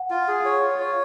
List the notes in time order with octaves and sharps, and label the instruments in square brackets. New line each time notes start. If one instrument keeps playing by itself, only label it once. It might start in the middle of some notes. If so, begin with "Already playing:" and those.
Already playing: [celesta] F#5
[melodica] F4
G#4
C#5
F4
C#5